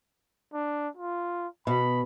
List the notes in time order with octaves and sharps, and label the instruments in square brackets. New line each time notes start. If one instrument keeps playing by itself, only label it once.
[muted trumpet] D4
F4
[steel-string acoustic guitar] B2 [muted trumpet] B5